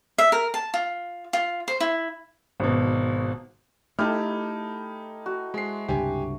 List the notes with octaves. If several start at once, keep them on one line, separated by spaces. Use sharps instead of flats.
E5
A#4
A5
F4
F4
C5
E4
G#1 B2
A3 D#4 E4 G4 A4 F6
F#4
G#3 C5 C7
C#2 G2 C3 G4 G#5